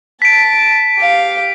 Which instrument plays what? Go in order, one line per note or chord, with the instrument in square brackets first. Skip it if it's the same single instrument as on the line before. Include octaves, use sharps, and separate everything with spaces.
[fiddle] A5 [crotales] B6 D7
[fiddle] G4 F5